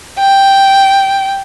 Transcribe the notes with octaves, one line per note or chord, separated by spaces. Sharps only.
G5